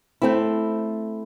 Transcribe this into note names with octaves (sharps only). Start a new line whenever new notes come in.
A3 C4 E4